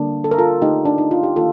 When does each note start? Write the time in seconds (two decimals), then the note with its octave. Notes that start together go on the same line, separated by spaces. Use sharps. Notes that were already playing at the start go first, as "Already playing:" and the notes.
Already playing: D3 G3 A#3 D4
0.24 A4
0.31 A#4
0.38 F4 A4
0.62 D3 A3 C4 D#4 G4
0.85 D4
0.98 D#4
1.11 F4
1.23 G4
1.36 D#3 A#3 F4 A4